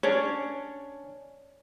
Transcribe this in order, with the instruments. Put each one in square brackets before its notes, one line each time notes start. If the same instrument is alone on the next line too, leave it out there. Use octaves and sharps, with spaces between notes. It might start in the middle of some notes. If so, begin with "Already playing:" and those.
[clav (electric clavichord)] C#4 D4 [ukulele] C#5